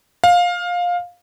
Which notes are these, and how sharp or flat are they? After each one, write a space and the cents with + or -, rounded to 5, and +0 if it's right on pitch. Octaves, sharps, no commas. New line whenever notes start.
F5 +15